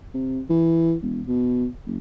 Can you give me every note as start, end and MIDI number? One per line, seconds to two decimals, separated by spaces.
0.14 0.41 48
0.49 0.94 52
1.02 1.21 28
1.27 1.67 47
1.86 1.99 30